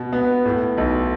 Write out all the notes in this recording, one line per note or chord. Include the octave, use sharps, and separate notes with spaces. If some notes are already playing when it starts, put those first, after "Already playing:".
Already playing: B2
B3
A2
B1